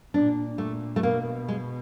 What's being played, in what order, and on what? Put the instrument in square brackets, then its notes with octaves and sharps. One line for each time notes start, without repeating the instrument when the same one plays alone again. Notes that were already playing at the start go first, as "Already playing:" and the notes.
[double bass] A#2 [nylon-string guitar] D4
[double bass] A#2 [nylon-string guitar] A3
[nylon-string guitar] A3
[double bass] B2 [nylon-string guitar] A#3
[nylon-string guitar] G#3